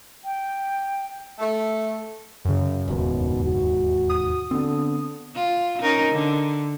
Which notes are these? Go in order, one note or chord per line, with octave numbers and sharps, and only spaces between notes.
G5
A3
F#2 C#3
E1 D#2 G#2 B2
F#4
D#6
D3 B3 C4
F4
C#4 D#4 A#4
D3